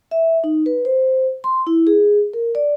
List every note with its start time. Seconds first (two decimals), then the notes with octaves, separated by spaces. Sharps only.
0.11 E5
0.44 D#4
0.66 B4
0.85 C5
1.44 C6
1.67 E4
1.87 G#4
2.33 A#4
2.55 D5